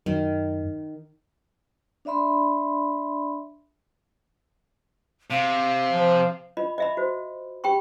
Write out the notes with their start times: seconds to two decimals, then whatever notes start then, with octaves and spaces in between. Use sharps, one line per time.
0.06 F#2 D#3
2.05 D4 D5 E5 B5 C6
5.30 C3 F5
5.92 F3
6.57 F4 D#5 B5
6.78 D#5 E5 B5
6.97 F#4 C5
7.64 G4 G5 B5 C#6